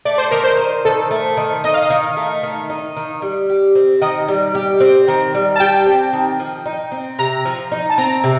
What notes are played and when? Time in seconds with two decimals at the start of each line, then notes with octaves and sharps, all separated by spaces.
0.05 A3 D5
0.18 C5
0.31 D#3 A#4
0.44 C5
0.58 D#4
0.85 D#3 A4
1.11 A3
1.37 D#3
1.64 D#4 D#5
1.74 F5
1.83 D#5
1.90 D#3
2.17 A3
2.43 D#3
2.70 D#4
2.97 D#3
3.22 G3
3.49 G4
3.75 C4
4.02 D#3 D#5
4.28 G3
4.55 G4
4.80 C4
5.08 D#3
5.34 G3
5.56 A5
5.60 G4 G5
5.86 C4
6.13 D#3
6.40 F3
6.66 D#4
6.92 C4
7.19 C3 A#5
7.45 F3
7.72 D#4
7.90 A5
7.98 C4 A#5
8.24 C3